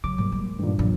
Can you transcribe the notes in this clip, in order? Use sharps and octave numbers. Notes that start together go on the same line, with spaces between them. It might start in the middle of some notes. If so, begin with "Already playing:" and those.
C#3 F#3 D6
G#2 F#3 G3 A#3
G#3
G2 A#2 D#3 A3
E2 C3 F#3 G3